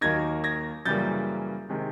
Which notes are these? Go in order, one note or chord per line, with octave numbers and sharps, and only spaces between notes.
D#2 D#3 F#3 A#3 D#4 G#6 A#6
G#6 A#6
F#2 C#3 E3 G3 A#3 G6 A6
C3 D#3 G#3